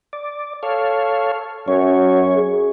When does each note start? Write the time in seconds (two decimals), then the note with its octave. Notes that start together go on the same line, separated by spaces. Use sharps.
0.13 D5
0.63 A4 C#5 F5
1.68 F#2 C#4 C#5
2.36 G#4